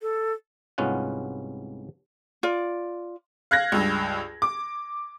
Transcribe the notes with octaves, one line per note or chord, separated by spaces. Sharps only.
A4
C2 G#2 B3 C#4 F4 F#5
F4 D5
F5 F#6 G#6 A#6
C#2 G2
D6